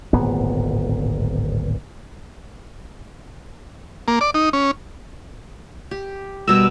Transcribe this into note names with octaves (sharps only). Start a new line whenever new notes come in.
D1 G#1 A#2 B3
A#3
D5
D#4
C#4
G4
B2 G3 A#4 E6